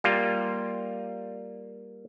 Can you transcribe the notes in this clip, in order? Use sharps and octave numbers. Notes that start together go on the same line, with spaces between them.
G3 A#3 F4